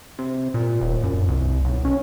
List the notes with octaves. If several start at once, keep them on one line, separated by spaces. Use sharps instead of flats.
C3
A#2
D#1
F#2
C2
B1
C#4